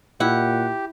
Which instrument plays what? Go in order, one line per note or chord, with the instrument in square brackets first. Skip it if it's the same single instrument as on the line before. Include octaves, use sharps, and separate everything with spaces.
[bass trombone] A#2 [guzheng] E4 [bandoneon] G4 [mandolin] F#5